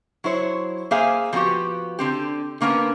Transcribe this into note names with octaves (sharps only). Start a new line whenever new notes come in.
F#3 E4 C5 C#5
A#3 G#4 C5 E5 F5 G#5
F3 G#3 B3 C4 F#4 G4
D3 C4 G4
D3 A#3 B3 C#4 A#4